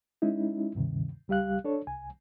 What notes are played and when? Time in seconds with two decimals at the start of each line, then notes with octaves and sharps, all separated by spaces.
0.22 G#3 C#4 D#4 E4
0.75 D2 G2 C3 D#3
1.28 C#2 G3 G4 F5 F#6
1.64 D4 A4 C#5
1.87 C2 G#5